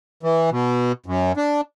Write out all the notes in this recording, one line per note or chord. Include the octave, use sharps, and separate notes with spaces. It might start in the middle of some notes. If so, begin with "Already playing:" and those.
E3
B2
F#2
D4